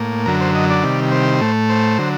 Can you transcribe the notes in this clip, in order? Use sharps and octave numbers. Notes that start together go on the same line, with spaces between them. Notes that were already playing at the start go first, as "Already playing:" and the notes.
Already playing: A2 A#3
F#2 D3 F#3 A#4
C5
D#5
D5
C3 D#3 G3
C5
A2 A3
C5
D3 F#3